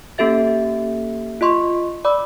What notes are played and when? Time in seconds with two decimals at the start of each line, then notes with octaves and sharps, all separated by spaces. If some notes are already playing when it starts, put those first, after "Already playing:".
0.18 A#3 C#4 G4 A4 E5 A6
1.41 F4 D#5 C6 C#6
2.05 D5 B5 D6 E6